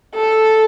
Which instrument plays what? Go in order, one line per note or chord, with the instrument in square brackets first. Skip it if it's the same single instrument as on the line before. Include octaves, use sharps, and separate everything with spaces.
[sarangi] A4